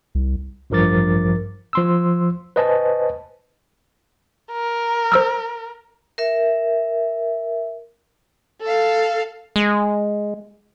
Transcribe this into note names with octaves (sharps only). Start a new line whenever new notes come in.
C2
A1 G2 F3 A#4 D6 A6
F3 C6 E6
B4 C5 D#5 G#5 A5
A#4
C5 E6 F6
A#4 E5
A4 F5
G#3